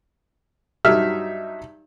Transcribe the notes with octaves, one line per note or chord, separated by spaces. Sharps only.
G2 F#3 D#4 E5 E6 F6